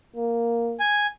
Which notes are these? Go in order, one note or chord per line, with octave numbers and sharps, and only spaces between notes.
A#3
G#5